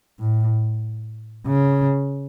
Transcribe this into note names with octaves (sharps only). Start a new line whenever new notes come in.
A2
C#3